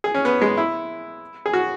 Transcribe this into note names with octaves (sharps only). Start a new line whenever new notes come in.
G#4
C#4
B3
G#3
E4
G#4
F#4